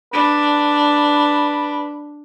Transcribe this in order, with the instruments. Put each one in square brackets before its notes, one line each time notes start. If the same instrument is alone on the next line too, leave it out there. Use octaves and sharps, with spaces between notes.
[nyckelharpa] D4 [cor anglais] B4